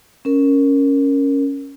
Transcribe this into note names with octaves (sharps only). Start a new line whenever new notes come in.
C#4 A#4